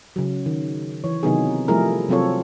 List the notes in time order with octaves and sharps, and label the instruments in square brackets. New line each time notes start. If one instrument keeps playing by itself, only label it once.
[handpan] C#3 F#3
D#3
E3 C#5
C3 D#3 F#3 B3 D#4 G#4
F3 G3 A3 E4 G#4 A#4
C3 F#3 C4 F4 A4 C#5